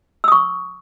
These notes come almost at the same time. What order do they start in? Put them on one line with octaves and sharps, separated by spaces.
E6 D#6 C#6